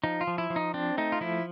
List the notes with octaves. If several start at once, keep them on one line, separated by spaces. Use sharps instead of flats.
F3 D#4
F4
F3
E4
F3
D#4
C4 D4
A3 D#4
F4
F3 E4